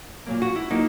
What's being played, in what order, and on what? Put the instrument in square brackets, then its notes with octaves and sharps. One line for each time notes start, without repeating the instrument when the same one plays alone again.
[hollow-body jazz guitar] A#2 F#3 A#3
F#4
E4
A#2 F#3 A#3 D#4